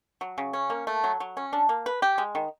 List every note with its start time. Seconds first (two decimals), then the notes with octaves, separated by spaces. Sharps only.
0.21 F#3
0.38 C#3
0.53 C#4
0.70 A#3
0.87 A3
1.04 F#3
1.20 F#3
1.37 C#4
1.53 D4
1.69 A#3
1.86 B4
2.02 G4
2.18 G#3
2.35 D#3